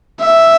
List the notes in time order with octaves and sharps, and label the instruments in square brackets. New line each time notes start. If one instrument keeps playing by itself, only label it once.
[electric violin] E5